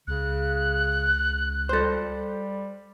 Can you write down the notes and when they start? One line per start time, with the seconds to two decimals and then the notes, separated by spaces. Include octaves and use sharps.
0.08 C#2 C#3 F#6
1.69 G3 A4 C5